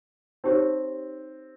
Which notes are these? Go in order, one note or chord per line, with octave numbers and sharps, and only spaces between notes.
C4 D#4 G4 C#5